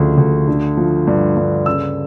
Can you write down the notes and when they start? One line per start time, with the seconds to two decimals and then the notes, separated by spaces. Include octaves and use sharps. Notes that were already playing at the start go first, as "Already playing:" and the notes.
Already playing: D2 C#3 F3
0.18 D2
0.48 D3
0.77 F3
1.07 G2
1.37 G2
1.66 C#3 E6